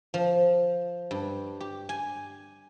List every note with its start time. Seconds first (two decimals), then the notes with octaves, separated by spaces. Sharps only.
0.14 F3
1.11 G2
1.60 G4
1.89 G#5